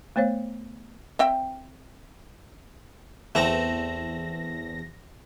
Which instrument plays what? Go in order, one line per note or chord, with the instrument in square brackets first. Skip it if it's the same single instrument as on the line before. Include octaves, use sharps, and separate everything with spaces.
[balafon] A3 B3 C5 C#5 F5
[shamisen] C4 E5 G5
[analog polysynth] E2 A#6 [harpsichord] A3 C4